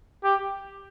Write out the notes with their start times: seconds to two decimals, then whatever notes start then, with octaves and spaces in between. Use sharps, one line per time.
0.24 G4